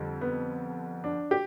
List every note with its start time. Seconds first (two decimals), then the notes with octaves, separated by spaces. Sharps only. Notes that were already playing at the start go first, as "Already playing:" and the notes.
Already playing: F2 D3 G3
0.21 B3
1.04 D4
1.31 G4